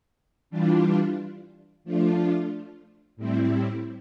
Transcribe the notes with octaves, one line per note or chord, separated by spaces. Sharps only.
E3 G3 D4 F4
F3 A3 D4 F4
A2 G3 C4 E4